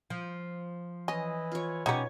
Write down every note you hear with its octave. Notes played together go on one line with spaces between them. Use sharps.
F3
E3 C#4 D#5
F4 C#5
B2 C#4 D#4 F#4 G4 B4 C#5